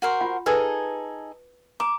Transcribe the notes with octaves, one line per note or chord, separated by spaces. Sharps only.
F#4 A#4 C5
F4 F#5
D#4 G#4 A4 B4
A#5 D6